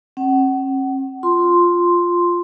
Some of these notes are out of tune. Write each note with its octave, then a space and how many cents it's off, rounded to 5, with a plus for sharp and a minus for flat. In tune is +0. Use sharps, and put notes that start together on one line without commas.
C#4 -45 F#5 +30
F4 +0 C6 +0